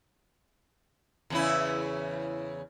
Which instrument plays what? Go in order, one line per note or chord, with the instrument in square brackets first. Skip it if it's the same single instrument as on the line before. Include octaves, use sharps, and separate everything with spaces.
[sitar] E2 C#3 E4